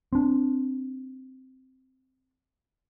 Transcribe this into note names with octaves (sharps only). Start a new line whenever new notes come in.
C4 D4